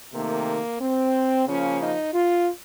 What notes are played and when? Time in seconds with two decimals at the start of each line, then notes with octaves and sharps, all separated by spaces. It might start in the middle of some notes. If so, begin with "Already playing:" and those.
0.13 C3 D#3 A3 A#3
0.80 C4
1.46 C#3 F3 A#3 C#4
1.79 D#4
2.13 F4